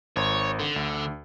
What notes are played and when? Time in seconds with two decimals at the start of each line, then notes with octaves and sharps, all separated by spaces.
0.16 G#1 C#5 C6
0.59 D3
0.76 D2